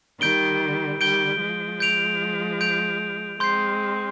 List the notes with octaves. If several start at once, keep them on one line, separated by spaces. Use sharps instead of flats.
D#3 G3 G6 D7 G7
D#3 G3 G6 D7 G7
F3 G#3
G6 D7 F7
G6 D7 F7
G#3 C4 C6 G6 C7